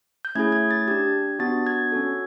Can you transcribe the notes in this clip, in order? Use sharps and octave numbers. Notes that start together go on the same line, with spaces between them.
G6
A3 C#4 E4 G#4 G#6
G#6
A6
D4 G4 G#6
B3 D4 F#4 A6
G#6
C#4 F#4 A4